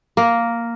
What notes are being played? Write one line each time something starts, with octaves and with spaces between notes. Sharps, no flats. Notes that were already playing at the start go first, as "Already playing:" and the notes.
A#3